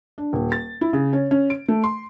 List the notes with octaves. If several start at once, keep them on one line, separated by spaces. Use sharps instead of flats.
D4
D#1
A6
E4
C#3
C#4
C#4
D7
A3
C6